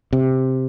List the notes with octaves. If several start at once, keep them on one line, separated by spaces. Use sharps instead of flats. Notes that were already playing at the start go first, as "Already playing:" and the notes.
C3